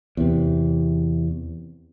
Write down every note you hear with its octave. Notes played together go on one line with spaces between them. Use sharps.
E2 C3